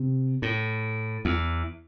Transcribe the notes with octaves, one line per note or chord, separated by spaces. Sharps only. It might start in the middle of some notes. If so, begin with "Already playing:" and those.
Already playing: C3
A2
E2